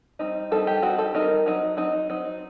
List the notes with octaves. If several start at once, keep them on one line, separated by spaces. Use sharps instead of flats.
G3 C4 D#4
G3 C4 D#4 A4
G4
G3 C4 D#4 F#4
A4
G3 C4 D#4 A#4
F#3 C4 D#4
F#3 C4 D#4
F#3 C4 D#4